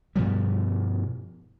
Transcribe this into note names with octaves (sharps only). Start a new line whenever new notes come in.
G2 B2 F3 G3